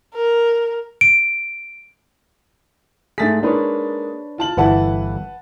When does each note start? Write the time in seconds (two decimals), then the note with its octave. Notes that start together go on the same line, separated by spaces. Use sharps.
0.15 A#4
1.01 D7
3.18 G#2 A3 G#4 A6 B6
3.43 G#3 A#3 D4 D#4 B4 C#5
4.38 F4 A5 F#7
4.57 G1 E3 E4 B4 F#5 A5